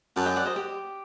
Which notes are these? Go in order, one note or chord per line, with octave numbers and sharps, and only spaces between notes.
F#2 F#5 A5
D#5 G5
D5 F#5
C5 D#5
G4